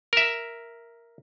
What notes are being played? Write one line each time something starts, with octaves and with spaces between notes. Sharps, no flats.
A#4 E5